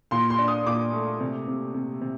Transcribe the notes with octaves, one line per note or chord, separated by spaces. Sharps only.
A#2 C6
C6
D4
D#6
A#2 D6
A3
C3
C3
C3
C3